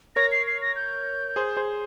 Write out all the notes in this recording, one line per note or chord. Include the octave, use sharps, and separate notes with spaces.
A#4 C#5 A#6
C7
C7
A#6
G6
G#4 C5
G#4 C5